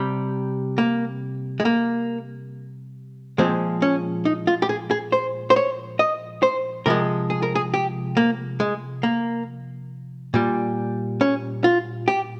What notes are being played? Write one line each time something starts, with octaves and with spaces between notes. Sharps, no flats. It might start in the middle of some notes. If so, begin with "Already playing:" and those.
Already playing: C3 G3
A#3
G#3
A#3
A#2 F3 G#3 C4
C#4
D#4
F4
G4
G#4
G#4
C5
C5
C#5
D#5
C5
C3 F3 G#3 A#4
G#4
A#4
G#4
G4
A#3
G#3
A#3
A#2 G3
C#4
F4
G4